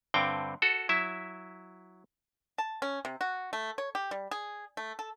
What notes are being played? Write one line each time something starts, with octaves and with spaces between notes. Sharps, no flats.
G2 D3 C4 G5
F#4 A4
F#3 E4 E5
A5
C#4
C3
F#4
A3
C#5
G4
G3
G#4
A3
A4